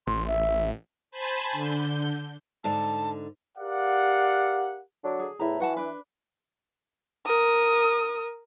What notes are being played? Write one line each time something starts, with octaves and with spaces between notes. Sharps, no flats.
A1 C6
E5
C5 G#5 A5 B5
D3 G6
G#2 D3 D5 A5
G4 A#4 D5 F5 F#5
D3 F#3 D4
G#4
E2 A2 E4 A#5
E3 F#4 F#5 A5
D4 B4
A#4 D#6